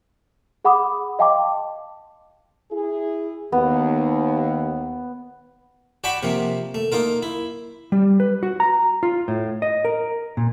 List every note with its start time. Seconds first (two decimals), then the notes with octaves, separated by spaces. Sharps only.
0.65 G#4 F#5 B5 D6 D#6
1.19 D#5 F5 G5 A5 C6 D6
2.71 E4 G#4
3.52 D#2 B3
6.04 F#4 D5 G5 A5 B5 C#6
6.23 C3 F3 A#3
6.75 A3
6.92 A#3 D#4 F4 A#4
7.23 E4
7.92 G3
8.20 B4
8.43 F#4
8.60 A#5
9.03 F4
9.28 A2
9.62 D#5
9.85 A#4
10.37 A#2